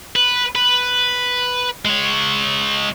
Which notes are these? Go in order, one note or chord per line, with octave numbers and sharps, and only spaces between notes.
B4
B4
G#3 C#5